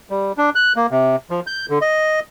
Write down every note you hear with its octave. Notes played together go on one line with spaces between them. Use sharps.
G3
D4
F#6
A#3
C3
F3
G6
D3
D#5